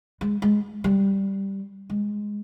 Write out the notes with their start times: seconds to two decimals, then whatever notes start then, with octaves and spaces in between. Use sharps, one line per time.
0.21 G#3
0.42 G#3
0.84 G3
1.90 G#3